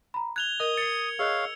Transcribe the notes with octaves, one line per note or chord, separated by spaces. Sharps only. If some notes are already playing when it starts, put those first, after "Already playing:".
A#5 B5
F#6 G#6 F7 G7
A#4 D#5 D#6
A6 C7 C#7
G#4 C#5 D#5 F5 E6 F#6